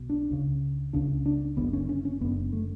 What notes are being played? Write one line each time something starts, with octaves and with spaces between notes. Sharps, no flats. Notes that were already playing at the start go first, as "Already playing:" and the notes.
Already playing: B1 B2
D4
C#2 C#3
C#2 C#3 D4
D4
F#1 F#2 D3 B3
C#4
C#4
C#4
F#1 F#2 D3 B3
A3